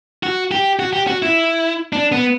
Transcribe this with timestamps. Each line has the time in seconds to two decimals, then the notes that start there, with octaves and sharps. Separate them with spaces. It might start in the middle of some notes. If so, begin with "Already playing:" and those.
0.23 F#4
0.51 G4
0.79 F#4
0.93 G4
1.07 F#4
1.22 E4
1.93 D4
2.12 B3